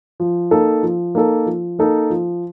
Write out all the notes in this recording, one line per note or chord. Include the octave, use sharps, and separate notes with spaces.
F3
A#3 D#4 A4
F3
A#3 D#4 A4
F3
A#3 D#4 A4
F3